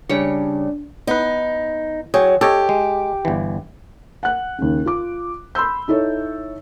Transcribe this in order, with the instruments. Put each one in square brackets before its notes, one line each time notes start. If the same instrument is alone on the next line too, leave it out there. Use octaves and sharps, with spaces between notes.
[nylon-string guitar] C#3 G3 C#5 [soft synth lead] D4
[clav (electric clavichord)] B3 B4 [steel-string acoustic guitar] D#4
[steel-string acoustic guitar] F#3 [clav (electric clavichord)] G#4 C#5 G5
[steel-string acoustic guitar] G4 [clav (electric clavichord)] A4 C#5 D#5
[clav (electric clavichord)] G#3
G1 E3
[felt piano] F#5 F#6
D#2 C#3
F4 D6
B5 C6 E6 G6
D#4 E4 A4 C#5